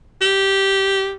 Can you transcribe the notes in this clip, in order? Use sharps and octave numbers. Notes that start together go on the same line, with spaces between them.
G4